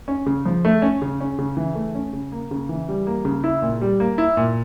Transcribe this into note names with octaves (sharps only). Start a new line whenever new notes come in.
C#4
C#3
F3
A3
C#4
C#3
C#4
C#3
E3
A3
C#4
C#3
A#3
C#3
E3
G3
A#3
C#3
E4
A#2
G3
A#3
E4
A#2